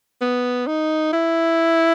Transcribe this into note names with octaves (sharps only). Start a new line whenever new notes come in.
B3
D#4
E4